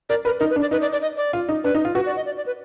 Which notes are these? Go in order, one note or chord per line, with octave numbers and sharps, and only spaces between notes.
A#4 D5
A#4 B4
D#4 A#4
B4
D4
D5
D#4 B4
D5
D5
D#5
D5
F4
D#4
D4 B4
D#4
F4
F#4 B4
D5
D#5
D5
D5
B4